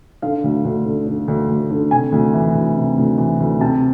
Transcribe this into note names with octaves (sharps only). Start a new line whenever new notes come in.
D3 F5
D2
D2
D3
D3
D2
D2
D3
C3 G#5
D2
E3
D2
C3
D2
E3
D2
C3 A5